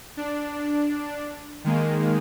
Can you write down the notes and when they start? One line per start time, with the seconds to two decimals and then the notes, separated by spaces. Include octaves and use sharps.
0.17 D4
1.64 D#3 G#3 A#3